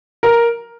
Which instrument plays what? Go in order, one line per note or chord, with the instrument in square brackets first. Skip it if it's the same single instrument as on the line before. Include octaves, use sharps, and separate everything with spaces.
[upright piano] A#4